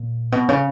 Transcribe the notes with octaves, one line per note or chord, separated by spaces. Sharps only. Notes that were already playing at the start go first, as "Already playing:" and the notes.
Already playing: A#2
B2
C#3